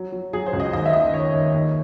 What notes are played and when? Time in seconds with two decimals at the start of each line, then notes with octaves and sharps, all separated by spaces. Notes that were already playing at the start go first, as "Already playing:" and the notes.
Already playing: F#3
0.12 F#3
0.33 F#3 G#4
0.46 C5
0.53 C#2
0.60 D#5
0.73 D#2 D#5
0.86 E5
0.93 D#2 D#5
1.13 D#2 C#5
1.33 D#2
1.54 D#2